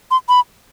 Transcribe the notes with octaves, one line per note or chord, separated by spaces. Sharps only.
C6
B5